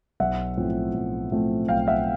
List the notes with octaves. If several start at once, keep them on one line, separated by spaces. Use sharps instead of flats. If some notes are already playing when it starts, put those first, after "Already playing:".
B1 E5 F#5
A2 F3 A3 C4
B1
A2 F3 A3 C4
B1 F5 G5
E5 F#5